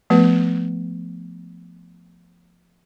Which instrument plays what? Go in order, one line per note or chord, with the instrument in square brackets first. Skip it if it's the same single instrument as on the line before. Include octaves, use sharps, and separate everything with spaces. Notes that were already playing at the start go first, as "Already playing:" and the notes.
[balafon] F3 A3 B3 B4